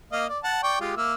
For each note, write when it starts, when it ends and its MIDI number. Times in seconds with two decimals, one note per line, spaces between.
0.12 0.26 58
0.12 0.26 75
0.12 0.26 77
0.29 0.39 74
0.44 0.60 78
0.44 0.60 81
0.63 0.80 74
0.63 0.80 79
0.63 0.80 85
0.80 0.93 56
0.80 0.93 65
0.80 0.93 67
0.97 1.15 58
0.97 1.15 76